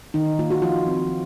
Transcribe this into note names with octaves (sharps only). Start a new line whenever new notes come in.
D#3 D#4
A#3 F4
F#4
F3 F4
C4